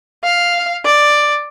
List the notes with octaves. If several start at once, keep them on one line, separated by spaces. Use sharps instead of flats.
F5
D5